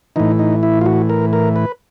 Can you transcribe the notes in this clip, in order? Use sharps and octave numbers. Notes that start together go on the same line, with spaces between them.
A2 E3 D#4
D#4
E4
F4
F#4
A#4
A#4
B4